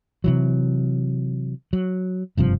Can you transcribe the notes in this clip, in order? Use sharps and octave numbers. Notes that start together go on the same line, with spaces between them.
C3 E3 F#3
F#3
F#1 G2 C3 F3